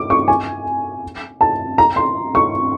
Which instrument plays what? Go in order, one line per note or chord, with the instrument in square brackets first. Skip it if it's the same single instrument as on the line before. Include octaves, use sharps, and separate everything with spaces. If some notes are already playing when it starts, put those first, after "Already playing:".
Already playing: [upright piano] D6
C#6
G#5
A5
A#5
C6
C#6